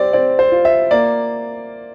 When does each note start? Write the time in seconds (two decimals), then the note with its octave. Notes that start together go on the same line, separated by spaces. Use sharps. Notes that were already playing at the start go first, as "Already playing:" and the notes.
Already playing: G3 C4 D5
0.13 C4 D5
0.39 C5
0.52 F4
0.65 E5
0.91 A#3 D5